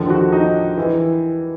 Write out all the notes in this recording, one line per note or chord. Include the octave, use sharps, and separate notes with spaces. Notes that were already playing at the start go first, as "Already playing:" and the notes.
Already playing: D#2 D3 F3
F#4
D#4
E3